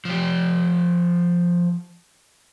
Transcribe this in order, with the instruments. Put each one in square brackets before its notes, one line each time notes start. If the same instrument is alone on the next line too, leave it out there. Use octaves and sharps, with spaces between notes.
[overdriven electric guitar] F3 G4